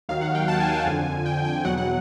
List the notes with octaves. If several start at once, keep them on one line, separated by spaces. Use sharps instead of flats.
D#2 D#3 F#3 F5
F#5
G5
A5
G#5
A5
F2 D3 F3 G#5
G5
G5
E2 B2 F#3 F#5
F#5